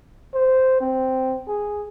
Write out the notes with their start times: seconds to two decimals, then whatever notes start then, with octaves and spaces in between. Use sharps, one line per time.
0.34 C5
0.81 C4
1.48 G#4